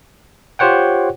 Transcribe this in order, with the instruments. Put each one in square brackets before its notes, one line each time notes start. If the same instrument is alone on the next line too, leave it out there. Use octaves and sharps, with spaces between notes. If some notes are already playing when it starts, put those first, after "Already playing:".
[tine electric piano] F4 G4 C5 C#5 F#5 G5